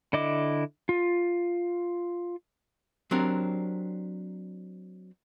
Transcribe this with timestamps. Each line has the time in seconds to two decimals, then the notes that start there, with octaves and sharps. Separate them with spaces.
0.13 D3 E4 D#5 D6
0.89 F4
3.11 F#3 C4 D4 G4 A#4